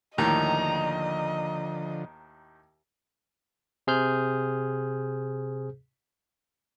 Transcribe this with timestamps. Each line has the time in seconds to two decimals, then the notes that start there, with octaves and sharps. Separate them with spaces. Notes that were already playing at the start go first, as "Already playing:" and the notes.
0.18 D#2 A2 D3 D#3 F3 D#5 A#5
3.87 C3 G#4 C5 F6 G6